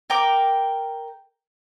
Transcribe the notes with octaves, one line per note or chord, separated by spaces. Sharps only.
A#4 G5 D6